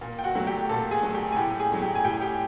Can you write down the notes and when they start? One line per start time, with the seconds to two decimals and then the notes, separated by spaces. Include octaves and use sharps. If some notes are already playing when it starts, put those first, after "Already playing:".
0.01 A#2
0.19 G5
0.24 F#4 F#5
0.35 F#3 A3
0.47 G4 G5
0.69 A#2 A4 A5
0.91 G#4 G#5
1.03 F#3 A3
1.14 G4 G5
1.32 G#5
1.37 A2 G4 G5
1.59 G#4 G#5
1.71 F#3 A3
1.82 G4 G5
1.95 G#5
2.05 A2 G4 G5
2.21 G4 G5